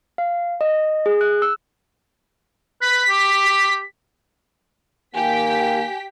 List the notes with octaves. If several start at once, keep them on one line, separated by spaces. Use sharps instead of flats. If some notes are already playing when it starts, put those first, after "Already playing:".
F5
D#5
G#4
F#6
E6
B4 B6
G4
D#3 A#3 G4 G#5 B6